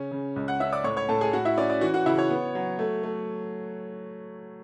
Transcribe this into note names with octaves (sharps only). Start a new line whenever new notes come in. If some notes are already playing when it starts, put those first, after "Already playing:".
Already playing: C#3 C#4
C#3
C#2
F#5 F#6
C#4 E5 E6
D5 D6
A2 C#5 C#6
C#5 C#6
A2 A4 A5
G#4 G#5
A2 F#4 F#5
E4 E5
C#4 D5
D5
E3 F#4 F#5
F#4 F#5
C#3 E4 E5
C#5
B3
F#3
A3
A3